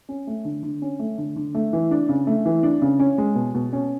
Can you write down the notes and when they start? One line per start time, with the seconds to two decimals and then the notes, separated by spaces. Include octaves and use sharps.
0.09 C#4
0.27 A3
0.45 D3
0.63 D3
0.82 C#4
0.99 A3
1.18 D3
1.36 D3
1.55 A3
1.73 E3
1.91 D4
2.09 C#3
2.27 A3
2.45 E3
2.63 D4
2.82 C#3
2.99 C#4
3.18 G#3
3.35 B2
3.54 B2
3.73 C#4